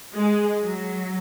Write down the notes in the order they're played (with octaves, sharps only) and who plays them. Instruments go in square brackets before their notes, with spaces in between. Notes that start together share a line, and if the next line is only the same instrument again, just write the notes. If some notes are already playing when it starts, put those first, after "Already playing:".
[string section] G#3
F#3